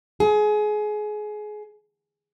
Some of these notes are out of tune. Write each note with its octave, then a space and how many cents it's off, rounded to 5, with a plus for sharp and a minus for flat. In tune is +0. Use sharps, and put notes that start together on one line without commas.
G#4 +25